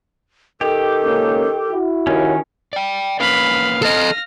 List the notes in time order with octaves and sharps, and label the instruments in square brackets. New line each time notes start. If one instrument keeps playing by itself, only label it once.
[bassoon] D#3 [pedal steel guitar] G4 [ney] A4
[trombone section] C#2 A#3 C#4
E4 F#4
[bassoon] D#2 [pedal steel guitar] D#3 C#4
[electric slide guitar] D5 G5
[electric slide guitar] A#3 C#4 B4 [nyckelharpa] F5 [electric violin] B5
[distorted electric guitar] A4 D#5 [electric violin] F6 A#6